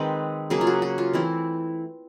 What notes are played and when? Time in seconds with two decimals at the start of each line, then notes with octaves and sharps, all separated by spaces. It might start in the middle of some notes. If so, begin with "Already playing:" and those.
Already playing: D#3 G#3 C4 B4
0.50 C#3 F#3 A#3 G#4
0.61 F4
0.67 F#4
0.82 F#4
0.98 F4
1.13 E3 A3 C4 E4